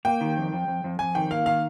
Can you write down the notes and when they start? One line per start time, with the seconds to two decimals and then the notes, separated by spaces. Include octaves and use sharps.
0.05 A#3 G5
0.21 D#3
0.37 F2
0.52 F2
0.68 F2
0.84 F2
0.99 F2 G#5
1.15 D#3 G5
1.31 A#3 F5
1.46 D#3 F5